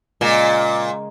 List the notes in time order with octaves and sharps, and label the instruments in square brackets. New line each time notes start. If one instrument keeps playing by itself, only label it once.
[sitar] A#2 [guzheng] C#3 G#3